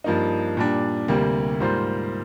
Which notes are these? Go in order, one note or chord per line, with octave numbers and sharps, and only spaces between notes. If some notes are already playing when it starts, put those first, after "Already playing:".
G2 F3 A#3 D#4
A#2 G3 D4
D2 C3 G3 A#3
G#2 G3 A#3 F4 C5